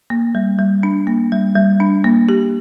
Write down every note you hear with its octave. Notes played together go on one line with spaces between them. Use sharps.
A#3
G3
G3
D4
A#3
G3
G3
D4
A#3
G4